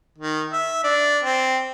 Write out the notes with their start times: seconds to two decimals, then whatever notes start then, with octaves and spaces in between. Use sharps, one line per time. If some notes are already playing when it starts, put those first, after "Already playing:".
0.18 D#3
0.53 E5
0.84 D4
1.24 C4